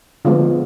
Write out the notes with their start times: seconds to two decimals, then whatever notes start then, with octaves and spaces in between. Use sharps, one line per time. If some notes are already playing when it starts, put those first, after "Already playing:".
0.25 D3 F3 G#3 B3 F4